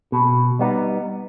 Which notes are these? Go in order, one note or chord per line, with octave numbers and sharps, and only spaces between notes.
B2
G3 B3 D#4